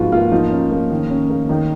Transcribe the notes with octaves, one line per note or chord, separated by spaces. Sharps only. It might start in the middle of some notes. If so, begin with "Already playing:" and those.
Already playing: G#2 F3 B3 F4 F#4
A#3 F4
F3 D#4
C#4
A#3
D#3
C#4
A#3
D#3 D#4